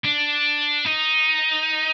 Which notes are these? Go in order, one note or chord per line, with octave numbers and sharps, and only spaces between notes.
D4
D#4